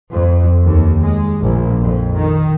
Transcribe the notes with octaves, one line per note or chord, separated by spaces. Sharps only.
F2
D#2
G#3
A#1
F2
D#3